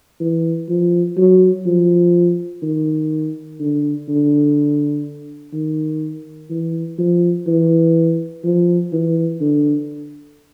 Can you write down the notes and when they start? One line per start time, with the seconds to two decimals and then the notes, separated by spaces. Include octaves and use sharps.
0.21 E3
0.69 F3
1.17 F#3
1.66 F3
2.62 D#3
3.60 D3
4.09 D3
5.53 D#3
6.50 E3
6.99 F3
7.47 E3
8.45 F3
8.93 E3
9.41 D3